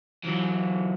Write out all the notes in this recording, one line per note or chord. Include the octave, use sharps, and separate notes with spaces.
E3 F#3